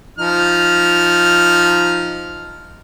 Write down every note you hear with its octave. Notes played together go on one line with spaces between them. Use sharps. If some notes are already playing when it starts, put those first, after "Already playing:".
F3 D#4 F6